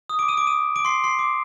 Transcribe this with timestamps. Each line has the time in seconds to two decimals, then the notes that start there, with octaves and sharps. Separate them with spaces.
0.09 D#6
0.19 D6 D7
0.28 D#6 D#7
0.37 D6 D7
0.47 D#6 D#7
0.76 D6 D7
0.85 C6 C7
1.04 C6 C7
1.19 D6